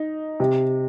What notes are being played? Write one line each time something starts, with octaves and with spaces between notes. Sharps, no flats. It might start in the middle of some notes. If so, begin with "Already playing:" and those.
Already playing: D#4
C3